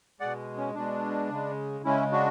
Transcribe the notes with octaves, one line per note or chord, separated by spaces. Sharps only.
B2 G#3 D5 F#5
C#4
B2 G#3 D4
C#3 G#3
C#3 G#3 C#4 E4
D4 F#4